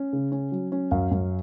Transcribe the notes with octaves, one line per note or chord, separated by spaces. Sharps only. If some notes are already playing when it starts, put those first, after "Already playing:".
Already playing: C#4
C#3
C#4
F#3
C#4
F#2 F5
F#2